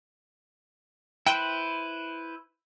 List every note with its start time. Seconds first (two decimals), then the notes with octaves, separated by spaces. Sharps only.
1.26 E4 B4 C5 G5